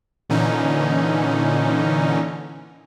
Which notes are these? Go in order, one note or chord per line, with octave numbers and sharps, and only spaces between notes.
A#2 D3 E3 C#4 D#4